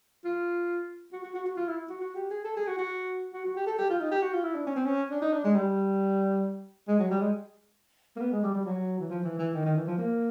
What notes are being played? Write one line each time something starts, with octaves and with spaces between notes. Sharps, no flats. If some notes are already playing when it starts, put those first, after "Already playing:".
F4
F#4
F#4
F#4
F#4
F4
E4
F#4
F#4
G4
G#4
A4
G#4
F#4
F#4
F#4
F#4
G4
A4
G4
F4
D#4
G4
F#4
F4
E4
D4
C#4
C4
C#4
D4
D#4
D4
G#3
G3
G#3
F#3
G3
G#3
A#3
B3
G#3
G3
G3
F#3
E3
F3
E3
E3
D#3
D#3
E3
F3
A#3